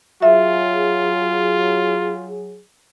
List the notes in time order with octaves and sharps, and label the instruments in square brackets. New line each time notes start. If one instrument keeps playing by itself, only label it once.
[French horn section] F#3 G#4 [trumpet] F4 [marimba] E5